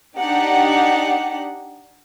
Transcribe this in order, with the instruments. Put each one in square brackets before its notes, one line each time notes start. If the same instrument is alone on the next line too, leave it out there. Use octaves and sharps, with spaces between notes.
[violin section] D4 D#4 G4 F#5